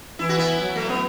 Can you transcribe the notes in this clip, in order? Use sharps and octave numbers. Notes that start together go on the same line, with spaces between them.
E3 E4
F#4
B3 E4
F#3
A3
B3